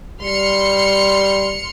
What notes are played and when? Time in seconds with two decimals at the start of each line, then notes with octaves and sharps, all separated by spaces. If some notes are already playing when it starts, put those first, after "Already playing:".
0.21 G3 C6 F6 C#7